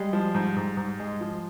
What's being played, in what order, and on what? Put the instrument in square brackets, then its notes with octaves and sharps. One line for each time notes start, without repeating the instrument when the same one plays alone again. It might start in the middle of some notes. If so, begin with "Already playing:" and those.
Already playing: [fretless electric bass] G3 [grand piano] G#3
[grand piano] F3
G#2
G#2
G#2
G#3
F3